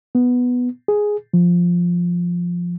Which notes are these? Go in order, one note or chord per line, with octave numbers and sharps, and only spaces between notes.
B3
G#4
F3